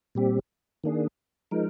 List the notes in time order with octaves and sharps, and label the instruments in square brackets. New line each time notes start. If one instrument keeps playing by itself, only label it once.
[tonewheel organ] A#2 G3 C4 G4
D#3 A#3 D4 G#4
F3 G#3 D#4 A#4